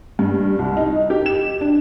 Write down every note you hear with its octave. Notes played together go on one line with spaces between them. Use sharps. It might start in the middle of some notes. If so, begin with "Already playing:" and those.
G2
C2
D#4
G4
E7
D4